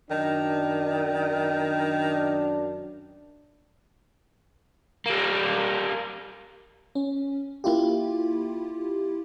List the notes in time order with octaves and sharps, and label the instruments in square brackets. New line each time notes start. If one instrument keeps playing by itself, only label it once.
[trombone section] F#2 D4 [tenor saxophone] D#3
[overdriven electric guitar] G3 A#3
[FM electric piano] C#4
A#3 E4 F4 G4